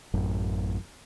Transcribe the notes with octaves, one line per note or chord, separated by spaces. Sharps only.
A1 F#2